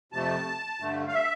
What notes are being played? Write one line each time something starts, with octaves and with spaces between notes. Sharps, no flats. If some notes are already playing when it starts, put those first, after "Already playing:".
F2 C3 F3 A3 A5
G2 D3 A3
F5
E5